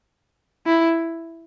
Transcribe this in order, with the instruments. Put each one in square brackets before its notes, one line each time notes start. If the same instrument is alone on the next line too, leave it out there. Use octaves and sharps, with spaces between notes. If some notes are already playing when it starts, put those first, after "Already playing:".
[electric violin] E4